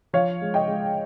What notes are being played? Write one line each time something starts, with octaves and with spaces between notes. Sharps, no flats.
F3 C#5 F5
G#3
D#5 G5
G#3